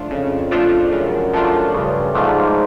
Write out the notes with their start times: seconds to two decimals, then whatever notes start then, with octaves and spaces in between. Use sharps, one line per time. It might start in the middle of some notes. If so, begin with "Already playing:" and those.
Already playing: F3 A3 D4 F4
0.10 F2 C#3
0.51 F3 A3 D4 F4
0.92 F#2 C#3
1.33 F3 A3 D4 F4
1.74 G2 C#3
2.14 G#2 F3 A3 D4 F4